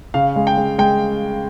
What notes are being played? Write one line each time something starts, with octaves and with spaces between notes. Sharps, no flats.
C#3 F5
G#3
G5
G#3
G#3 G5